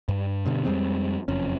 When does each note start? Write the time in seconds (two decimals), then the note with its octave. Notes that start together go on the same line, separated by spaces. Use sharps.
0.09 G2
0.46 G2 B2 D3
0.65 F2 G3 G#3 C4
1.28 F#1 F2 C#4